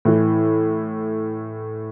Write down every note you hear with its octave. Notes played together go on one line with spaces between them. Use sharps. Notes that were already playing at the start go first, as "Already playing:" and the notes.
A2 E3